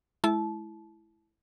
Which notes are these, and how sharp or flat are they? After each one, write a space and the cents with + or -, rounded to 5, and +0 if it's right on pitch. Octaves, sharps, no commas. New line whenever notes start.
G#3 +40 E4 +0 A5 -25